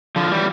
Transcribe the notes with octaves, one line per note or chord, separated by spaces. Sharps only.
D3 F3
E3 G3